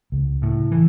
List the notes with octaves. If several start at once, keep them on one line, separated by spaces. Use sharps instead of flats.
C#2
A2
E3